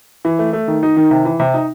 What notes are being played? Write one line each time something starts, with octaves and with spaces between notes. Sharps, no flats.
E3
A3
A3
D#3
D#4
D#3
C3
E3
C3
D#4